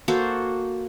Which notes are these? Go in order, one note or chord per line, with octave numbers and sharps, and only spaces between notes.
A#3 F#4 A4 C5